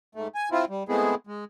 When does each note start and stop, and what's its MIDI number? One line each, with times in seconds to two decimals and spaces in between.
0.15 0.28 44
0.15 0.28 57
0.35 0.49 80
0.52 0.65 60
0.52 0.65 64
0.52 0.65 65
0.70 0.83 55
0.89 1.15 56
0.89 1.15 57
0.89 1.15 59
0.89 1.15 60
0.89 1.15 64
0.89 1.15 68
1.27 1.44 56